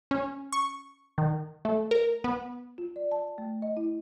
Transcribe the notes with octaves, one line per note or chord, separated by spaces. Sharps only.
C#4
C#6
D#3
A3
A#4
B3
F4
D5
A5
A3
D#5
E4